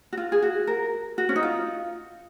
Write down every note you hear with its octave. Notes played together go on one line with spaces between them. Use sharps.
F#4
F4
G#4
F#4
A#4
F#4
C#4
D#4
F4